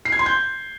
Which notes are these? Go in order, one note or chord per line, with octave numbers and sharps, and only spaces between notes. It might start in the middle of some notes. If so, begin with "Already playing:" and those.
C7
G#6
C6
G6